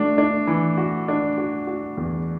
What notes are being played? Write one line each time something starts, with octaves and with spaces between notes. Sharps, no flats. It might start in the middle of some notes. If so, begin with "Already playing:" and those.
Already playing: A3 D4 F#4
D4
E3
F#4
D4
F#4
F#4
E2